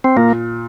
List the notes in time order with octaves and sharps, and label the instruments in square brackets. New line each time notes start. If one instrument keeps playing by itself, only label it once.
[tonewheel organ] C4
[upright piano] A#2 [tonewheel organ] A#3